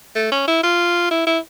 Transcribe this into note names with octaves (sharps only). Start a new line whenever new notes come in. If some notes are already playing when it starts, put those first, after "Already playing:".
A3
C#4
E4
F4
E4
E4